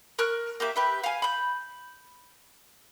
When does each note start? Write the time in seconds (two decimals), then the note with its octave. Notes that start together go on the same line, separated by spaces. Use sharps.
0.19 A#4 C#6 F6 F#6
0.60 A#3 G4 E5 D6
0.76 G4 B4 E5
1.04 F5 G#5
1.22 B5 G6